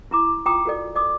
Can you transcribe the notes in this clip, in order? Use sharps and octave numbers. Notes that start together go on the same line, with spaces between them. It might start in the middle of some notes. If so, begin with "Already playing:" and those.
E4 A#5 D6
F4 G5 A#5 D6 D#6
F#4 A4 D5
D5 D6 D#6